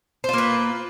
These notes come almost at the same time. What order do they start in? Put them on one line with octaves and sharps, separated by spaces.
C5 F4 A#3 B4